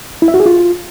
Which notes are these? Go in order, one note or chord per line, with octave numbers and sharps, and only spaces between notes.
E4
E5
F#4
G#4
F4